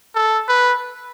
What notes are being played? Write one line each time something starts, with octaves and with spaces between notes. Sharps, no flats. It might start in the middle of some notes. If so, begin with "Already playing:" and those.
A4
B4